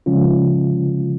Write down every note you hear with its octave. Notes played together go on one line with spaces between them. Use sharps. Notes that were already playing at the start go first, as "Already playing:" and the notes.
C#3 F3 G#3 C#4 F4